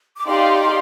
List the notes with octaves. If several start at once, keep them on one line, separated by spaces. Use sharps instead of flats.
D6
D#4 G4 D5 F5 C6